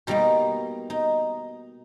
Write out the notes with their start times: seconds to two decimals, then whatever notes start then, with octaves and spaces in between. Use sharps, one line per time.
0.07 B2 G3 A#3 D#4
0.90 D#4